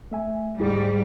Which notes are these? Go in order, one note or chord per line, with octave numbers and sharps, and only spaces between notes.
A3 E5 G#5
D2 G#2 G3 E4 G#4